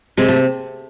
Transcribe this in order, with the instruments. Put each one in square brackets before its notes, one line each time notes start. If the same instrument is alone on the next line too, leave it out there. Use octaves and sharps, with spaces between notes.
[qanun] C3 [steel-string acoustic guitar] G#3
[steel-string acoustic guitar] A3